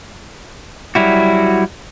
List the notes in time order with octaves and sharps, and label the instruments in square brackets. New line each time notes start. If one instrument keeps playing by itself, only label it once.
[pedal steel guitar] F#3 G3 E4 F#4